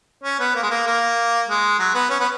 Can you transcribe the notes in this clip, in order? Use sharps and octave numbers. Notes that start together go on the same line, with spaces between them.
C#4
B3
A#3
G#3
A#3
A#3
G#3
F#3
B3
C#4
B3